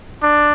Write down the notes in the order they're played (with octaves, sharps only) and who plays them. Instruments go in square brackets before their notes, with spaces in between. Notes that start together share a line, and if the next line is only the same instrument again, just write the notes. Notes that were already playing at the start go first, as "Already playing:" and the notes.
[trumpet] D4